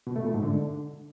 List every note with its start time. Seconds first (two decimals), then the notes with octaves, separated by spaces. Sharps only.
0.07 B2
0.16 A3
0.25 A#2
0.34 G#2
0.43 D3